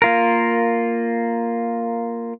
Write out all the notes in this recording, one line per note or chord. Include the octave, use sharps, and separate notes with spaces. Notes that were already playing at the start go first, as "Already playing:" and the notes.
A#3 F4 A#4